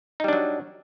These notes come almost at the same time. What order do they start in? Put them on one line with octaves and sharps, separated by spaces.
D#4 G3 D4 F#3